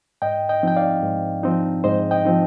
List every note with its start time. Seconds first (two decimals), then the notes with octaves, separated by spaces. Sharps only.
0.22 G#2 D#5 G5
0.49 D#5 G5
0.63 F3 C4 D#4 G5
0.76 D5 F5
1.03 G#2
1.43 F3 C4 D#4
1.84 G#2 C5 D#5
2.11 D#5 G5
2.25 F3 C4 D#4